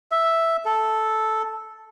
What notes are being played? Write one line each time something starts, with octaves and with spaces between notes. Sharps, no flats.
E5
A4